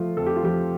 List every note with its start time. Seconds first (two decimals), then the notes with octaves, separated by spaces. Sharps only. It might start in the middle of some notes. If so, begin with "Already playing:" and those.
Already playing: F3 A3 F4
0.17 F2 A4
0.26 G4
0.36 F4
0.43 F3 G4